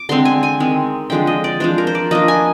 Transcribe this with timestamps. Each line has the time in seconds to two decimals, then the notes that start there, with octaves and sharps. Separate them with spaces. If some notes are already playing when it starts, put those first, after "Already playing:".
Already playing: D6
0.09 D3 G#3 C4 C6
0.25 G#5
0.43 G#5
0.60 D#3 G#3 C4
1.10 D3 F3 G#3 D4 G5
1.27 D#5
1.44 D5
1.60 F3 G#3 D4 C5
1.78 A#4
1.87 C5
1.95 D5
2.11 F3 A#3 D4 D#5
2.28 G#5